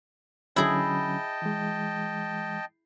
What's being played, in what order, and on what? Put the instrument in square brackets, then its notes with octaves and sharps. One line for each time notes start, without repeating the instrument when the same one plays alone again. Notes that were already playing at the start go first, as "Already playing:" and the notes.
[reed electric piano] D3 F#3 C#4 [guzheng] E4 G#4 [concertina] D#5 G5 A5
[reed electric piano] E3 G#3